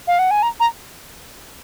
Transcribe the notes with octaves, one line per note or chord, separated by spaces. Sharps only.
F5
F#5
G#5
A#5
A#5